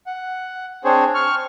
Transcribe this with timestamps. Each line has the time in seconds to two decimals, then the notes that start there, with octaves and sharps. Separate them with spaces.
0.07 F#5
0.85 C4 D4 G#4 C5 C#5
1.15 C#6 F6